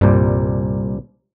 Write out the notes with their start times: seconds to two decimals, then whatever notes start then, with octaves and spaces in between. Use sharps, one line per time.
0.01 C2 G2 A#2 G3